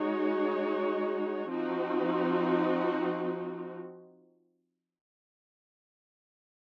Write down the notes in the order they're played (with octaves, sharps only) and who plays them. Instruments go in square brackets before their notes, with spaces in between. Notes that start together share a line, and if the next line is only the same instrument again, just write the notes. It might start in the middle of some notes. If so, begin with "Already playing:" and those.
Already playing: [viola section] G#3 D#4 F#4 C#5
F3 C4 D#4 F#4